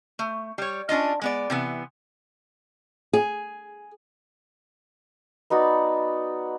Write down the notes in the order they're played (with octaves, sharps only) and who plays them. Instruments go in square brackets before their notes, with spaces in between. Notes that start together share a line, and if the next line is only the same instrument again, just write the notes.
[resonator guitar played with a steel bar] A3
G3 C#5
C#4 D4 F4 D#5
G#3 B3 D5
C3 E3 B3
[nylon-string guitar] G#4
[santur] B3 D#4 F#4 D5